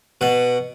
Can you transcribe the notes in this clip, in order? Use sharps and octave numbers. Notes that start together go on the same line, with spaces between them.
B2 F#5